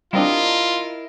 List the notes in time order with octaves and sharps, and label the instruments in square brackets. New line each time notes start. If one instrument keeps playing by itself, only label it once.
[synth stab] G3 C4 D4 [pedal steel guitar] E4 A#4 D#5 [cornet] F4